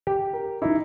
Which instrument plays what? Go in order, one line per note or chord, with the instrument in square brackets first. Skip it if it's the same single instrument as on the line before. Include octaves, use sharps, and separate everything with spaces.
[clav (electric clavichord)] G4
[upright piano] A#4
D#4 E4